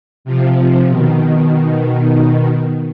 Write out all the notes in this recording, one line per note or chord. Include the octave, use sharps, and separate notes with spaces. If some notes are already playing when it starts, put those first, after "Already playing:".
C3 F3
B2 D#3